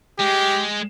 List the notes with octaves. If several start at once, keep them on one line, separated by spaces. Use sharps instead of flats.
G#3 G4